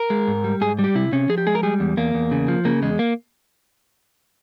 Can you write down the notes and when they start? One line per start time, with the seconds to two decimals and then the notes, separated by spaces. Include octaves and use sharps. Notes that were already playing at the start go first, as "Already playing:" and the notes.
Already playing: A#4
0.10 G#3
0.28 G#2
0.44 G3
0.61 G#2 G#4
0.79 G3
0.84 G4
0.95 C3 E4
1.12 C3 C#4
1.29 F3 G#4
1.38 G4
1.47 G#3 G#4
1.55 A#4
1.63 G3 G#4
1.80 E2
1.97 E2 A#3
2.14 E2
2.31 C#3
2.48 F3
2.65 C#3 A#3
2.83 E2 G#3
2.99 A#3